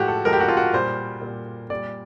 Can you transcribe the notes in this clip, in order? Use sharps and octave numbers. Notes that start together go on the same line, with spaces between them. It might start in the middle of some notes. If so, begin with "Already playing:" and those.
Already playing: A2 F3 G#3 F#4 G4
A4
A2 F3 G#3 A#4
G4
F#4
F4
F#4
A#2 G3 C5
A#2 G3
A#2 G3 D5